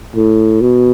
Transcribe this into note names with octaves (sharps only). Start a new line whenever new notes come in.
A2
B2